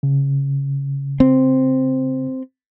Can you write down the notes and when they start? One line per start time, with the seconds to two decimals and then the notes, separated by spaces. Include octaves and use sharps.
0.03 C#3
1.20 C4